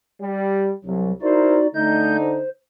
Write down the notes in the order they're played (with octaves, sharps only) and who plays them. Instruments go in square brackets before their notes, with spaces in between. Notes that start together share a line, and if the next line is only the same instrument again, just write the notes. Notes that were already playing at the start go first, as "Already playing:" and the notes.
[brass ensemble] G3
[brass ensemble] C2 [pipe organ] F#3
[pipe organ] D#4 F#4 D5 [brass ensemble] E4 A#4 C5
[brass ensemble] D3 D#4 [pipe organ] A3 D#5 G6
[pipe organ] C5